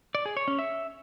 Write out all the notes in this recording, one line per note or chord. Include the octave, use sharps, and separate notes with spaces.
D5
G#4
C#5
C#4
E5